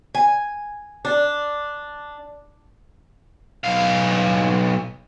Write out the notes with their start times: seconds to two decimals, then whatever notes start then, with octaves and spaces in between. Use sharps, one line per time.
0.15 G#5
1.05 D4
3.64 B1 F5